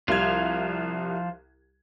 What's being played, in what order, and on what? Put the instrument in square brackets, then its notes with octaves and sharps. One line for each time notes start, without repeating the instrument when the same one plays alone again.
[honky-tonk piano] C2 G3 G#6 [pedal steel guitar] F3 F4